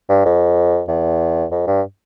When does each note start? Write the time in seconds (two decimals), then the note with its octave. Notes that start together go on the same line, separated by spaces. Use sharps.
0.09 G2
0.25 F2
0.88 E2
1.52 F2
1.67 G2